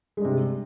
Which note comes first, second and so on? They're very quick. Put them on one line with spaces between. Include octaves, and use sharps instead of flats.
G#3 G2 C3